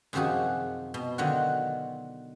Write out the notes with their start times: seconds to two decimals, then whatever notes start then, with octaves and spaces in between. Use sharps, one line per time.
0.13 F#2 C3 D#3 F3 F#4 G#4
0.94 B2
1.18 D3 D#3 F#3 F4 F#4